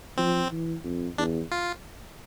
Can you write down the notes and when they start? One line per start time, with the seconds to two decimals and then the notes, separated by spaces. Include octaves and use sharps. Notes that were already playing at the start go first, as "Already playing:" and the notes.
0.18 F3 C4
0.52 E3
0.84 F2
1.18 E2 D4
1.52 F4